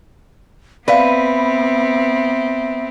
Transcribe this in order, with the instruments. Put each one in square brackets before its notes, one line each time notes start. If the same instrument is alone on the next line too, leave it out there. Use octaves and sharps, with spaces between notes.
[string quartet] B3 C4 [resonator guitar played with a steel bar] B4 [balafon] D5 F5 [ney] E5